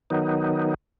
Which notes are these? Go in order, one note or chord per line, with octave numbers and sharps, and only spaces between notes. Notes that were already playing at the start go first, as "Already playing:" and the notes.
D#3 F#3 B3 D#4